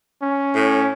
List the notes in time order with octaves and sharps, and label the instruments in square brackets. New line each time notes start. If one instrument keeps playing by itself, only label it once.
[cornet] C#4
[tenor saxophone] A2